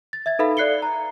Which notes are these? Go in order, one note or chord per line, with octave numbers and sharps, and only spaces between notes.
A6
E5 G#6 A6
D#4 A4 B4 E5 F5 B5
A4 D5 F#6 C7 C#7 G7
A#5